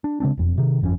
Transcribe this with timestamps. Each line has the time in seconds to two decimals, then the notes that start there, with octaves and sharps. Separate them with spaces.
0.04 D4
0.20 C#3 G#3 C4 D4
0.38 E1 F2
0.58 C3 D#3
0.81 G1 F2 C#4